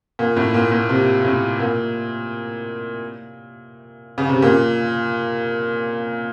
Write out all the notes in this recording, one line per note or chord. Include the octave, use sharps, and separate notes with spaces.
A#2
A2
A#2
A#2
C3
A2
A#2
C#3
C3
A#2